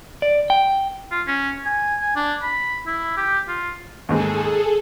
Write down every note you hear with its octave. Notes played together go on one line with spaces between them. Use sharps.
D5
G5
F4
C#4
G#5
G#5
D4
B5
E4
G4
F4
D#2 G#2 G#4 A4